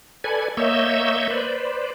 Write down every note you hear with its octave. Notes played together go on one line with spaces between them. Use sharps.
A4 B4 D5 G#5 G#6
A#3 C#5 D#5 E5 E6 G6
B4 C5 D5